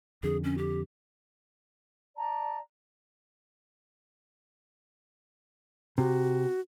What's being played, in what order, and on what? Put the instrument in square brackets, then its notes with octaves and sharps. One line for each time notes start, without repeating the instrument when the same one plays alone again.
[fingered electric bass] F2 D3 [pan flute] G#4
[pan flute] C#4
G4
[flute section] D5 A5 A#5
[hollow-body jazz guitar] C3 [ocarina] F#4